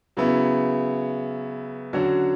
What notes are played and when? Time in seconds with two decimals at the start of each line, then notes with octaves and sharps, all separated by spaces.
0.17 C#3 F#3 B3 E4
1.93 D3 F#3 C#4 F#4